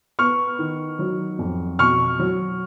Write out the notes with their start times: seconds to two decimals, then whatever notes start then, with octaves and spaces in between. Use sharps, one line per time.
0.19 B3 C#6 F6
0.59 D#3
0.99 F#3
1.39 F2
1.79 B2 C#6 F6
2.19 F#3